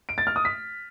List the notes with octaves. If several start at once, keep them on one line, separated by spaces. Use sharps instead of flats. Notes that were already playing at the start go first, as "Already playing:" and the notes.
D7
A6
F6
D#6
B6